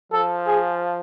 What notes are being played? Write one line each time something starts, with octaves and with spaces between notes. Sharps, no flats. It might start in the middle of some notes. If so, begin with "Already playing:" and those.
F3 A4
G#4